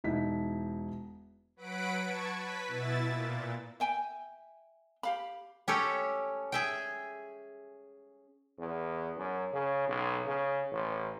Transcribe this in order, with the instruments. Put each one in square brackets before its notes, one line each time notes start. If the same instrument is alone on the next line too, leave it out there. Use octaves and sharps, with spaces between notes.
[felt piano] E1 D#4 E4 B6
[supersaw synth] F#3 B4 F#5 B6 D7
A5 C#6 G#6
B4 B6
B2 E4 E5 A6
A#2
[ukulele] E5 G5 G#5
G4 F5 B5
[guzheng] C#4 G4 A4 C#5
G#4 E5 G5
[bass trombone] E2
F#2
C#3
B1
C#3
A1